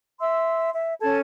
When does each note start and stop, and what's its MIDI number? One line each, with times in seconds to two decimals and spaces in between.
0.21 0.70 76
0.21 0.70 84
0.21 0.70 88
0.74 0.94 76
1.01 1.20 61
1.01 1.20 69
1.01 1.20 81
1.01 1.20 92